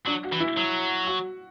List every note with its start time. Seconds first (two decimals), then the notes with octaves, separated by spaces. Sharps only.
0.06 F#3 D4
0.24 F#4
0.32 E3
0.40 E4
0.57 F#3
1.07 F#4